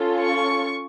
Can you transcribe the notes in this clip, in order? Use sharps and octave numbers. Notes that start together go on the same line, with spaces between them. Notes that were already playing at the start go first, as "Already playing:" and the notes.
Already playing: C#4 F4 A4
C#6